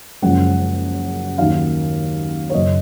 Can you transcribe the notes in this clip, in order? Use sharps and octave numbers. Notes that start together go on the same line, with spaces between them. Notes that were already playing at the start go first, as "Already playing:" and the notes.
F#1 F#2 F3 G#3 F#5
D#2 D#3 F#3 F5
C#5
F#1 F#2 C#3 D#5